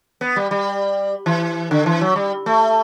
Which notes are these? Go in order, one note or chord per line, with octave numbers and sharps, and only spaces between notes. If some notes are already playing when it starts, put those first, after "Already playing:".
B3
G3
G3
E3
D3
E3
F#3
G3
A3